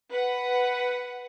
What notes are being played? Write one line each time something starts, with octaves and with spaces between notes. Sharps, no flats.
B4 F#5